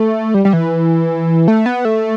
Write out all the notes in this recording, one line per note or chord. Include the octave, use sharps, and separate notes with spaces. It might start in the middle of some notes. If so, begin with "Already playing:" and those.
Already playing: A3
G3
G3
E3
A3
B3
A3